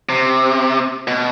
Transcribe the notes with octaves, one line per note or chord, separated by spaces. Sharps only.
C3
B2